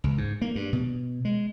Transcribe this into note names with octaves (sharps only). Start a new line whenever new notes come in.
C#2
G#2
A#3
G2
B2
G#3